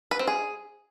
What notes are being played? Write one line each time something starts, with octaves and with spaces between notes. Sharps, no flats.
B4
C4
G#4